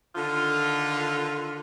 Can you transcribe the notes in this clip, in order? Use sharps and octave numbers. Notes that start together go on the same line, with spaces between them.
D3 D#3 F4